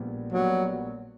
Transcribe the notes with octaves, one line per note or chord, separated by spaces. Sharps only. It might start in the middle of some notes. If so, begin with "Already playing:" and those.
Already playing: A#1 A#2 G3 B3
A#1 A#2 F#3 G3 B3